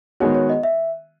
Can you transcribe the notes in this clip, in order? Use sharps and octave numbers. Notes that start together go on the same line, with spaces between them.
D#3 G#3 B3 F#4 C#5
C#5
D#5
E5